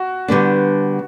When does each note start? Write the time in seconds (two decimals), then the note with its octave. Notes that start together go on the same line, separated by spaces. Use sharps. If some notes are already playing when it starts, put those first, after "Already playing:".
Already playing: F#4
0.28 D3 G3 B3 D4